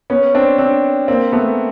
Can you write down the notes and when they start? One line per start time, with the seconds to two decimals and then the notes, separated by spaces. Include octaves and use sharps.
0.10 B3 C#4
0.35 C4 D4
0.58 C4 D4
1.08 A#3 C4
1.32 A3 B3